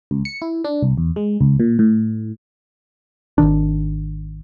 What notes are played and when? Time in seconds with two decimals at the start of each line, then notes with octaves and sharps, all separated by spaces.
0.11 C#2
0.25 C#7
0.42 E4
0.64 D4
0.83 C2
0.97 E2
1.16 G#3
1.41 C#2
1.60 A#2
1.79 A2
3.38 G#1 C#2 D#3 D4